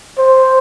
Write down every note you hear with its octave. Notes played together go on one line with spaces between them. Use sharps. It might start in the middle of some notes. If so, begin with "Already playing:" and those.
C5